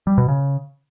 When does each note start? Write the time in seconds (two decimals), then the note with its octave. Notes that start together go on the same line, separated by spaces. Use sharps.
0.07 G3
0.18 B2
0.28 C#3